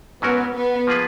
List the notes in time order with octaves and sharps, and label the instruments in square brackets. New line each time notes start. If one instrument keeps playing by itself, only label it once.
[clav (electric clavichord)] G#2 F#3 C#4 F#4 A#4 [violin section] B3
[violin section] B3
[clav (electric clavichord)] F3 A#3 F4 G#4 B4